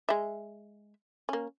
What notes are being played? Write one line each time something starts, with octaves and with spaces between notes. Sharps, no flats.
G#3 E5
A#3 C#4